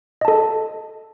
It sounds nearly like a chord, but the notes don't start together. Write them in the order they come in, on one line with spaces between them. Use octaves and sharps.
D#5 A5 A4